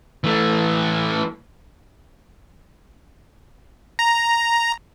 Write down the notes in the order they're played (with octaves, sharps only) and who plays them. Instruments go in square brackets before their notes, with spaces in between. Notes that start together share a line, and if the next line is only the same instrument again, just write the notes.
[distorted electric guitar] E3 A3
[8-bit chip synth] A#5